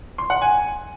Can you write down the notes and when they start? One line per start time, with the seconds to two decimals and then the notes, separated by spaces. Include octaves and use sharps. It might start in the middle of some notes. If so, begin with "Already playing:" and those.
0.18 C6
0.30 F#5
0.41 G#5